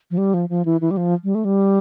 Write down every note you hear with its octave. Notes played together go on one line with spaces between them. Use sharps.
F3
G3
F3
F3
E3
E3
G3
F3
G3
A3
G3